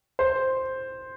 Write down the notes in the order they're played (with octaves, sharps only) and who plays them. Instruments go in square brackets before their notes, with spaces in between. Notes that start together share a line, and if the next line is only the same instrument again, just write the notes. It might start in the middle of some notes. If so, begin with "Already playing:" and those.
[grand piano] C5